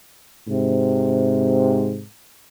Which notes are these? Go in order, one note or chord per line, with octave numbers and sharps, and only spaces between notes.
G#2 C3